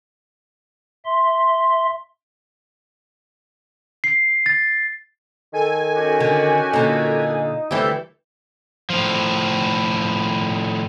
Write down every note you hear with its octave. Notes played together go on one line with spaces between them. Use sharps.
E5 C6
C7
A6
D#3 A4 G#5
C#4 F#4 G4
D3
A#2 D3 D#4
D2 C3 E3 G3 G4 A4 E5 G6
A2 F3